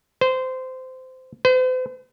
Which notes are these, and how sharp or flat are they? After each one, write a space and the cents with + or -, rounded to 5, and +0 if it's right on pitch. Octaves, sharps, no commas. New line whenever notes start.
C5 -20
C5 -45